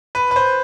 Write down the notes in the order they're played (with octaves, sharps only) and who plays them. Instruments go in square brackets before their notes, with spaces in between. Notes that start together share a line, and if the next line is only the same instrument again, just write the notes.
[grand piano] B4
B4
C5